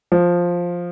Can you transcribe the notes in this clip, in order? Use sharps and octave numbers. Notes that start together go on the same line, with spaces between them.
F3